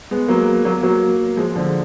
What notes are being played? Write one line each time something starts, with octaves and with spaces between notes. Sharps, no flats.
G#3 B3
F#3 A#3
F#3 A#3
F#3 A#3
F3 G#3
D3 F3